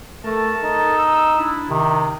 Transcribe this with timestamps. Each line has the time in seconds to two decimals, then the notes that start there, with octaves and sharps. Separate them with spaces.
0.24 A3 A4 A#4 A5
0.63 D#4
0.97 E6
1.37 D4 E4
1.70 C3 D#3